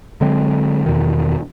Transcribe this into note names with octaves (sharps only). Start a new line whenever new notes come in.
D3 F#3 G#3 C4
E2 B2 D#3